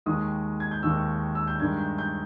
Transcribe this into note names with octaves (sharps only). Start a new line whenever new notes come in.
D#2 D#3 G#3 D#6
G#6
G6
D#2 D#3 G#3 E6
E6
G6
G2 D#3 G#3 G#6
G6
G6